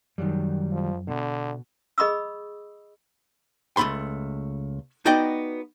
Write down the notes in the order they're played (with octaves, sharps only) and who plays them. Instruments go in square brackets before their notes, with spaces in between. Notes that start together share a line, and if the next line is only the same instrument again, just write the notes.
[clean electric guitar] F#2 [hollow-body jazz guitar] D#3 F#3 G3
[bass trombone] F3
[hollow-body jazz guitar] B2 [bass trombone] D3
[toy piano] G#4 D#5 B5 C#6 D#6 E6
[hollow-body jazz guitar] C#2 G2 A3 B5 C6
B3 D#4 F#4 D5 D#5 G5